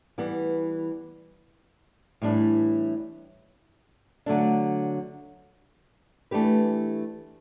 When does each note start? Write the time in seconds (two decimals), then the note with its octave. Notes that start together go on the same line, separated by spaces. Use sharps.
0.18 E3 G3 B3
2.22 A2 E3 G3 D4
4.26 D3 F#3 A3 D4
6.31 E3 A3 D4 G4 B4